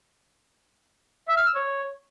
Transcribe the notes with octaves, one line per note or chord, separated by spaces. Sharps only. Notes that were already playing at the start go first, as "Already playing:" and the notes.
E5
F6
E6
C#5